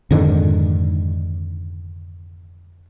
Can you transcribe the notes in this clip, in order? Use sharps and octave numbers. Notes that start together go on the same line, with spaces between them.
F2 G#2 D3 D#3